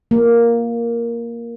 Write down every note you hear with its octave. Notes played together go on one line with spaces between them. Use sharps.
A#3